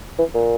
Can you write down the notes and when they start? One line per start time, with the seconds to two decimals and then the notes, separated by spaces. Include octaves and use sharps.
0.19 E3
0.34 A#2